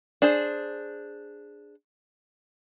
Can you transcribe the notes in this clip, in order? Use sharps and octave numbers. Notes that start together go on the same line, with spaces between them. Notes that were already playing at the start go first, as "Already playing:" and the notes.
D4 G#4 C5